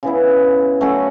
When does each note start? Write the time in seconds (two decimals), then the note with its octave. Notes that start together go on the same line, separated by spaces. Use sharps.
0.03 C#3 E3 B3 E4
0.81 F#3 A3 C#4 F#4